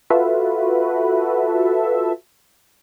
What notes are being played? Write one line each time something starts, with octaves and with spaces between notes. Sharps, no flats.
F4 F#4 A4 B4 E5